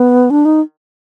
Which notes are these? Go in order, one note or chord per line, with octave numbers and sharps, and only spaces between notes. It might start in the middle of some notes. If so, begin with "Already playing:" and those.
Already playing: B3
D4
D#4